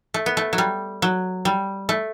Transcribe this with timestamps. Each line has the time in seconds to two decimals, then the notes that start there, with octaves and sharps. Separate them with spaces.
0.14 A3
0.26 B3
0.37 A3
0.53 F#3
0.58 G3
1.02 F#3
1.45 G3
1.89 A3